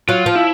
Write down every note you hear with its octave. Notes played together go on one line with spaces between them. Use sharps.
F#3 F4
F3
E4